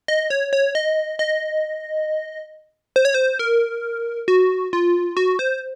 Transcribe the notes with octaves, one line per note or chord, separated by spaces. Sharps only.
D#5
C#5
C#5
D#5
D#5
C5
C#5
C5
A#4
F#4
F4
F#4
C5